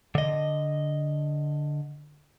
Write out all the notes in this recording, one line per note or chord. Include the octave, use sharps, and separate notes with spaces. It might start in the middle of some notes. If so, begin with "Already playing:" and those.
D3 D#5